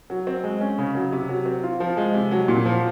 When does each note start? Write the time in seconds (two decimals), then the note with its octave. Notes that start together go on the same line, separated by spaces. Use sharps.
0.10 F#3
0.27 C4
0.44 G#3
0.61 C#4
0.78 C#3
0.95 F#3
1.12 C3
1.29 F#3
1.46 C4
1.63 F4
1.80 F3
1.97 G#3
2.14 C3
2.31 F#3
2.48 A#2
2.65 F3